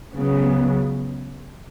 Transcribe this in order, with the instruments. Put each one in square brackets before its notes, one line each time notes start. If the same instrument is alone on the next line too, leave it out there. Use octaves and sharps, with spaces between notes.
[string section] C#2 C#3 F#3 B3